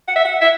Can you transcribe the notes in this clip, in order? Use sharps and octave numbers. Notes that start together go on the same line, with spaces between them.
F#5
E5
F#5
E5